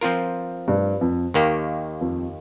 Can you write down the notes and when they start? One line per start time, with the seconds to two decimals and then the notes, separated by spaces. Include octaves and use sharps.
0.01 F3 C4 F4 A#4
0.68 G2
1.01 F2
1.34 D#2 D#3 A#3 G4
2.01 F2